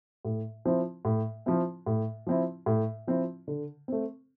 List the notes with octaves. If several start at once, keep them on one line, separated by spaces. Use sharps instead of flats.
A2
F3 C4 E4
A2
F3 C4 E4
A2
F3 C4 E4
A2
F3 C4 E4
D3
A3 C4